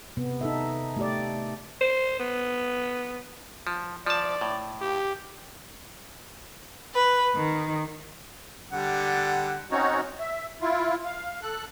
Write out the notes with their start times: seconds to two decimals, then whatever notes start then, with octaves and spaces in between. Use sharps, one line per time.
0.17 C3 B3
0.41 D#4 A4 E5
0.97 A3 G4 D5
1.81 C5
2.20 B3
3.67 F3
4.06 F3 D5 A5
4.41 A2
4.81 G4
6.95 B4
7.35 D#3
8.72 D3 G3 F#5
9.71 C4 C#4 D#4 F#4 C#5
10.19 E5
10.61 E4 F4
11.05 F5
11.42 A4 F#6